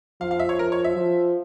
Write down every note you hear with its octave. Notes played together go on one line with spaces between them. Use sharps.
F3 F5
F5
E5
C#5
A#4
C#5
E5
F3